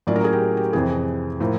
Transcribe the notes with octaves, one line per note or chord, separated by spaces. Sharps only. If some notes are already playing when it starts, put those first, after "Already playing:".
A2 F#3 A#3 C#4 F4 D5
A#4
G#4
G4
G4
F2 C3 E3 G#4
A2 F3 A#3